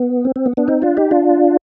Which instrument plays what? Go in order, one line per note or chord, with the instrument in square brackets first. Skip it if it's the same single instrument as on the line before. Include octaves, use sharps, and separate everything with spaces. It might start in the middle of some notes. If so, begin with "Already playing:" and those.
Already playing: [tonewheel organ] B3
C4
C4
B3
B3 D4
C4 D#4
D4 F4
D#4 G4
D4 F4